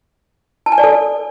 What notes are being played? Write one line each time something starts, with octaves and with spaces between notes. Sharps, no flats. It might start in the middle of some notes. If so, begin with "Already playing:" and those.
A5
G#5
D5
A4